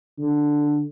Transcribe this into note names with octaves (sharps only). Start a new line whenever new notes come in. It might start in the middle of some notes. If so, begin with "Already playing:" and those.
D3